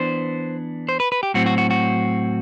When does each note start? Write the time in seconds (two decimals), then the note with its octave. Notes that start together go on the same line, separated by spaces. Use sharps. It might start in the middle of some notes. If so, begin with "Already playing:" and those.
Already playing: E3 B3 D4 C5
0.89 C5
1.00 B4
1.12 B4
1.23 G4
1.34 A2 F#3 C4 F#4
1.46 F#4
1.58 F#4
1.71 F#4